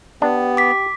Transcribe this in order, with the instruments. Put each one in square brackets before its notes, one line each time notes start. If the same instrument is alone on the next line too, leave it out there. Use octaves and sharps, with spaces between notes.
[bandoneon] B3 [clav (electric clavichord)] D4 [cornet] G4
[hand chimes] D6 B6